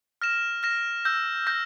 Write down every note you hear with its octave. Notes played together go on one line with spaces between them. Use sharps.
F6 A#6 E7
F6 A#6 E7
E6 G6 A#6
E6 G6 A#6